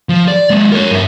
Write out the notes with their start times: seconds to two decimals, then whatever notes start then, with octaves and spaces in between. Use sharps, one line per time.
0.09 F3
0.28 D5
0.51 G#3 A#3
0.72 A#4 C#5
0.91 G2 E5